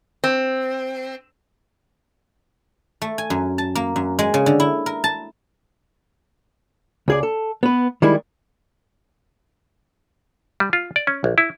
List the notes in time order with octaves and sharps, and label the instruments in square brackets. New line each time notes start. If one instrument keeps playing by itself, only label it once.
[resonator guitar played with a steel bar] C4
[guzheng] A3
G#5
F#2
A5
A#3
F#2
G#3
C#3
D3
E4
A#4
A5
[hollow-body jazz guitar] C#2 G#4 D5
A4
B3 B4
D#3 G3 G#3 E4
[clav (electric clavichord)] G3
F4
D5
C#4
A#1
E4